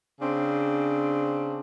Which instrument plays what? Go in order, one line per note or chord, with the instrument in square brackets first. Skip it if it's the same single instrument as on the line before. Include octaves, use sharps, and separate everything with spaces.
[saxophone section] C#3 C4 D4